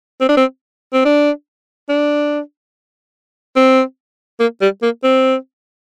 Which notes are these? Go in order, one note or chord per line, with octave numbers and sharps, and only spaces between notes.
C4
D4
C4
C4
D4
D4
C4
A#3
G3
A#3
C4